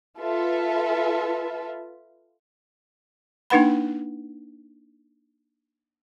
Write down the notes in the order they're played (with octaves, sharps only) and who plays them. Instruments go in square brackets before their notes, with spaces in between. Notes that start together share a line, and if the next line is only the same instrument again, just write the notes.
[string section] F4 A4 B4 E5
[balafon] A#3 D4 D#4 B4 F#5 B5